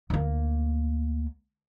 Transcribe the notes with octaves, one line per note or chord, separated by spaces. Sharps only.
D2 A#3